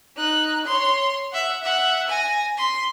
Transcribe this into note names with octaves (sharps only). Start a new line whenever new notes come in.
D#4 F#6
C#5 C6
E5 F#5
E5 F#5
G#5 A#6
C6 B6